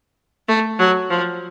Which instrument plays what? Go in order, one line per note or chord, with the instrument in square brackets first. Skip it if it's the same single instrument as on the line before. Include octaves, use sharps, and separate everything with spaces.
[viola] A3
F#3
F3